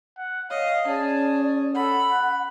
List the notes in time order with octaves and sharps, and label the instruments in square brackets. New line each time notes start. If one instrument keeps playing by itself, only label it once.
[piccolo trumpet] F#5
[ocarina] C#5 [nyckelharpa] D#5 [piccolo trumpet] F5
[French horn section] C#4 [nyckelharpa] G#4 [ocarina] D5 [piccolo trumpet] A5
[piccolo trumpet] A4 [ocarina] F#5 [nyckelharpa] B5
[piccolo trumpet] F#6